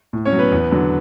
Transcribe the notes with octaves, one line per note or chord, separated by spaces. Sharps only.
A2
C#4 C#5
F#3
B3 B4
E2
D3 F#3